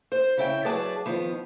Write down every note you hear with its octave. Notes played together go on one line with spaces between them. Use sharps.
C5
C#3 E4 G5
F#3 G#4 B4 D5 A5
D#3 F3 B3